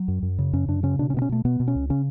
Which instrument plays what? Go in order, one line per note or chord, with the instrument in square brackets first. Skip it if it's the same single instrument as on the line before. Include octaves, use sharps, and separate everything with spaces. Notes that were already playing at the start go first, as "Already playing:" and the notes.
Already playing: [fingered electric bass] F#3
F#2
F#2
C#3
F#2 C#4
F#2 D4
C#3 C#4
B2 D4
C#4
B2 B3
C#4
B2 A3
B2 B3
B2
C#4
C#2
C#3 C#4